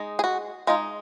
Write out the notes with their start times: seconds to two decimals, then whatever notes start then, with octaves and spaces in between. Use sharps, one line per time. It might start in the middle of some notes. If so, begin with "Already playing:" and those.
Already playing: G#3 D#4
0.19 G#4
0.24 F#4
0.67 G#3 D#4 F4